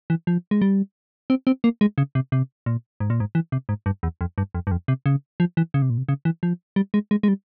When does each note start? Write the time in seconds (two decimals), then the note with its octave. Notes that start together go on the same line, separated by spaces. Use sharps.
0.10 E3
0.27 F3
0.51 G#3
0.62 G3
1.30 C4
1.47 C4
1.64 A#3
1.81 G#3
1.98 C#3
2.15 C3
2.32 C3
2.66 A#2
3.00 G#2
3.10 A#2
3.20 G#2
3.35 E3
3.52 C3
3.69 G#2
3.86 G2
4.03 E2
4.21 F2
4.38 G2
4.55 F2
4.67 G2
4.71 F2
4.88 C3
5.06 C#3
5.40 F3
5.57 E3
5.74 C#3
5.82 C3
5.90 A#2
5.98 C3
6.09 C#3
6.25 E3
6.43 F3
6.76 G3
6.94 G#3
7.11 G#3
7.23 G#3
7.28 G3